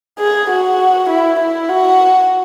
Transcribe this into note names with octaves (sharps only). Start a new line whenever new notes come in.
G#4
F#4
E4
E4
F#4